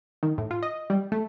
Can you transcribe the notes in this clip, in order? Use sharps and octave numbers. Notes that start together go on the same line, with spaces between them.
D#3
A2
F4
D#5
G3
A3